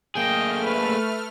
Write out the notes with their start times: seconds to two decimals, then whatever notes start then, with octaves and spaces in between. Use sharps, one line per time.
0.15 A3 A#3 G#4 D#5 G5 F6
0.64 B4